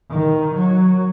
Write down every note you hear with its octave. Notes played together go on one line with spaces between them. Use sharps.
D#3
F#3